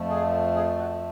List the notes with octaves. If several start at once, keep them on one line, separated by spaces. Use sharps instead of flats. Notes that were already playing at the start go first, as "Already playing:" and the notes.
Already playing: F2 F3 A3
G#4
G#4
F#4